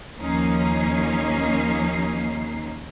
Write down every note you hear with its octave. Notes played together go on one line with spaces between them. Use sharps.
D#2 F3 A#3 C#4 D#4 C7